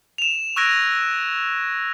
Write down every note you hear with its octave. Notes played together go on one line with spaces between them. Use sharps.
E7 F7
C#6 E6 F#6 G#6 A#6 D7